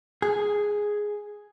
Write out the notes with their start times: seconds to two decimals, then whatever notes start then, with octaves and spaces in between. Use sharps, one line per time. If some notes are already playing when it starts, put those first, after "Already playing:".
0.22 G#4